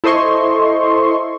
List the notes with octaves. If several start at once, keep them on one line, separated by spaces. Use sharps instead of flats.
E4 A4 C5 D#5 C6 C#6